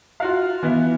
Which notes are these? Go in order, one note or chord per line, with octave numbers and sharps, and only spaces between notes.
F4 F#4 F5
E3 B3 E4